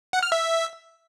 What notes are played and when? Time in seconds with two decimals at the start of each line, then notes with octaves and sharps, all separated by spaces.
0.13 F#5
0.23 F6
0.32 E5